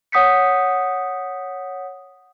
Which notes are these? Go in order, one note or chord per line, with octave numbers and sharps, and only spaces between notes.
C#5 F#5 D#6 G6 B6 C#7